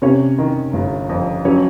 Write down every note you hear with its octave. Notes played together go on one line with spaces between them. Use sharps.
C3 C#4 C#5
D#3
G1
F2
F#3 C#4 C#5